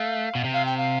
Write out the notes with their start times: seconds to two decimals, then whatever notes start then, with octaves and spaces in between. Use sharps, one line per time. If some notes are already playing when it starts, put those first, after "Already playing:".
Already playing: A3 F5
0.35 B2
0.44 C3
0.54 F5
0.66 G5
0.77 F5